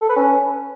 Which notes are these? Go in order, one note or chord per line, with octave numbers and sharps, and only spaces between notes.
A4
B4
C#4